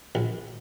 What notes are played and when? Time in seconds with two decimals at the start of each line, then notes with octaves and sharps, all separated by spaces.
0.15 A#1